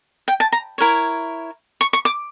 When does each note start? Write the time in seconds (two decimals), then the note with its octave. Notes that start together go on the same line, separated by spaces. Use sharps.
0.28 G5
0.40 A5
0.52 A#5
0.78 E4 A#4 C#5
1.81 C#6
1.93 C#6
2.05 D6